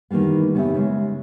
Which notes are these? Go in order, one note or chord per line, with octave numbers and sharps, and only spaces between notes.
D#3 E3 G3 A#3 B3
C#3 B3 D#4 G4 E5
C#3 G#3